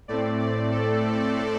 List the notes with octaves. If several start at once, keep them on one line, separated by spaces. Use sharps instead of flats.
A2 A3 C4 D5
D5
A4